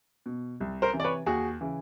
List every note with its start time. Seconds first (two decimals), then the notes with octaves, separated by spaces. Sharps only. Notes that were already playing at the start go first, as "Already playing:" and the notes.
0.26 B2
0.60 C2
0.82 A#4 C5
0.93 C3 E3
1.00 D5
1.04 B4 C#5
1.26 D#2 F#4 G#4
1.61 C#3 E3